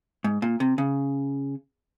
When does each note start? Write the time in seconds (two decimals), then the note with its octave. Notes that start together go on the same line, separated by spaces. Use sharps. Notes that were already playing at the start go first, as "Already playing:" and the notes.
0.24 G#2
0.42 A#2
0.60 C3
0.78 C#3